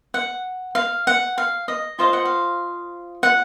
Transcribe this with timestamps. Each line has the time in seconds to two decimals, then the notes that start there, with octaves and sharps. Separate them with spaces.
0.14 F#5
0.75 F5
1.07 F#5
1.38 F5
1.68 D#5
1.99 F4 C5 D#5 F5
2.13 F#5
2.25 F5
3.23 F#5